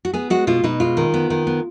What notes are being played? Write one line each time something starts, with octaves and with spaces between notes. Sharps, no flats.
F#4
B3 G#4
G#3 F#4
B2 F4
B2 D#4
G#3 F4
D#3
B3
D#3
B3